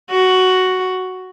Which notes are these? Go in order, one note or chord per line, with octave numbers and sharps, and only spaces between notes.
F#4